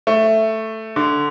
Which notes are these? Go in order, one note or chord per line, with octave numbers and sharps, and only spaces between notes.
A3
D3